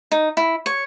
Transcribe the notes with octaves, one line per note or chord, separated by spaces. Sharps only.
D#4
E4
C#5